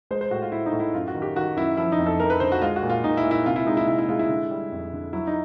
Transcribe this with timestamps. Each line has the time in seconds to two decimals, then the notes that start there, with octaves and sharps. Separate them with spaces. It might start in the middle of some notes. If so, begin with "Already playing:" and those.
0.11 G#3 C5
0.21 C5
0.31 A2 F#4
0.42 F4
0.52 A2 E4
0.66 D#4
0.73 A2
0.80 E4
0.93 F#2 F4
1.08 F#4
1.14 D#3
1.22 G4
1.36 D#3 F#4
1.56 F#2 E4
1.77 F3 E4
1.92 D#4
1.99 F2
2.06 A4
2.20 F2 A#4
2.30 B4
2.40 D3 C5
2.52 F#4
2.62 G#3 F4
2.76 F#4
2.83 A#2
2.90 F4
3.04 A#2 D#4
3.17 E4
3.24 A#2
3.31 E4
3.45 C3 F4
3.56 E4
3.66 G#3 D#4
3.77 E4
3.87 C3 E4
3.98 E4
4.09 G#3 F4
4.19 E4
4.29 D3
4.51 G3
4.72 F2
4.92 D3
5.13 F#3 E4
5.27 D#4